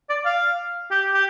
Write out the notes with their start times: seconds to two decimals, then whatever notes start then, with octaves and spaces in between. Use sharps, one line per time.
0.10 D5
0.25 F5
0.91 G4
1.14 G4